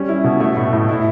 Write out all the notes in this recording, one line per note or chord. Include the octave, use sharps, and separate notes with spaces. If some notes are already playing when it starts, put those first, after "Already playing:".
Already playing: G3 C#4
E4
B2
A3
A2
A2
E4